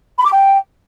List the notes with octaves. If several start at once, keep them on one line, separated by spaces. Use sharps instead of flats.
B5
D6
G5